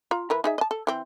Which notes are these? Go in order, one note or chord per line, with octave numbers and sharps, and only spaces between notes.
F4 A#5
E3 A#4 B4
D#4 G#4 E5
D#5 A5
A4
E3 C4